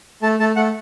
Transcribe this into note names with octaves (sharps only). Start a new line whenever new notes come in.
A3 A5
A3 A5
A3 F#5